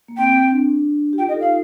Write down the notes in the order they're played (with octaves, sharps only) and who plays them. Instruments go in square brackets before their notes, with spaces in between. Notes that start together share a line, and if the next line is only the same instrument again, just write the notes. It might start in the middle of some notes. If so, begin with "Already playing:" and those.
[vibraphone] A#3
[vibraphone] C4 [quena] G5
[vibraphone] C4
D4
G4
[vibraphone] F4 [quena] G5
[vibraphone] D#4 G4 [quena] D#5
[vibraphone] F4 A4
[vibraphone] D#4 [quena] F5